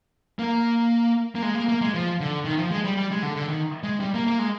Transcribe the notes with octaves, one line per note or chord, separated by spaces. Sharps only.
A#3
A#3
G#3
A#3
A#3
G#3
F3
D3
D#3
F3
G#3
G3
G3
G#3
D3
D3
D#3
G#3
G3
A#3
A#3
G#3